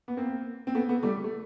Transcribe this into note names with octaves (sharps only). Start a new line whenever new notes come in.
B3
A#3 C4
C4
A3 B3
A3 B3
G3 A3
A3